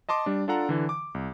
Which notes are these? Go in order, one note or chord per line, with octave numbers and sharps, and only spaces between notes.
D#5 A5 C6 D6
G3 D4
D4 F4 A4 F#5 A#5
D3 E3
D6
C2